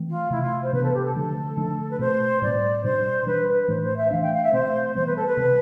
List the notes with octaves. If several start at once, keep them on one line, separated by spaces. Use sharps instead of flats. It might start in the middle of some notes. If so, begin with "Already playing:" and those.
Already playing: E3 A3 C4
F4
C3 E3 A3 E4
F4
C5
C3 E3 B3 D4 B4
A4
G4
A4
D3 F3 A3 D4 A4
D3 F3 A3 D4
B4
B2 A3 C4 C5
A2 G3 C4 D5
B2 G3 D4 C5
E3 G3 D4 B4
B4
A2 E3 A3 D4 C5
C5
E5
E3 A3 D4 F5
G5
F5
E5
B2 A3 C4 C5
E3 G3 B3 C5
B4
A4
B4
C3 G3 C4